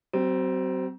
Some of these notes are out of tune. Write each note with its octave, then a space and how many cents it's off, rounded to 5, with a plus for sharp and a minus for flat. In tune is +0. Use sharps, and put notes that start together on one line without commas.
F#3 +40 C4 -10